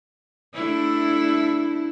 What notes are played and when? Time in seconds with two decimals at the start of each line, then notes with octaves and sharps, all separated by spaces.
0.54 A3 D4 E4